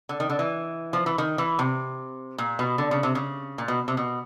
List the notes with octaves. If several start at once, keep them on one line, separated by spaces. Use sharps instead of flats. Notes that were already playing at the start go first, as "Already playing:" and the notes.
D3
D#3
D3
E3
F3
E3
D#3
E3
C3
A#2
B2
D3
C#3
C3
C#3
A#2
B2
C3
B2